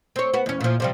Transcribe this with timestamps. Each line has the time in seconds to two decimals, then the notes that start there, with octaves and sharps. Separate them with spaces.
0.16 C4 C#5
0.34 B3 F#4
0.46 E2 C#4
0.61 A#2 F3
0.80 C3 F3 G3